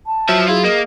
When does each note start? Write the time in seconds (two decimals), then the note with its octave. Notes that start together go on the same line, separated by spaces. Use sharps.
0.06 A5
0.29 F3 F#3 E5
0.48 E4 F4 G#4
0.64 A#3 D#5